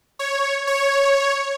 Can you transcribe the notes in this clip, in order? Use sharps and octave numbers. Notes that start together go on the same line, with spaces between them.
C#5
C#5